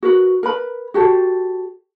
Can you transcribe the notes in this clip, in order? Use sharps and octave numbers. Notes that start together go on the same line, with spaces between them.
F#4 A#4 B4
A#4 B4 B5
F#4 G4 A4 C5